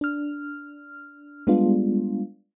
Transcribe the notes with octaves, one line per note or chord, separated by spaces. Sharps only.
D4 F6
G3 G#3 B3 D4 F4